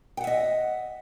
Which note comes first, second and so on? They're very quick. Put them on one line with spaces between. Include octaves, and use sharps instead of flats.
G5 F#5 E5 D#5